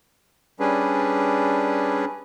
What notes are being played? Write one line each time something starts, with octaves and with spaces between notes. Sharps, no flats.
G3 C#4 D4 G#4 B4